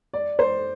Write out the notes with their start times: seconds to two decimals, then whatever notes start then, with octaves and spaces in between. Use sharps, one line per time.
0.13 D5
0.39 C5